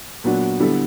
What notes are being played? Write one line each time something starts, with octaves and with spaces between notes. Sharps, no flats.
A#2 F#3 B3 D4 F#4
D3 G3 B3 E4 A4